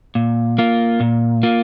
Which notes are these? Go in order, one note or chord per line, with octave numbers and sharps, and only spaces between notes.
A#2
A#3 F4
A#2
A#3 F4